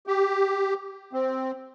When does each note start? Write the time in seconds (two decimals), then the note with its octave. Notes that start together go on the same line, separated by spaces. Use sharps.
0.07 G4
1.13 C4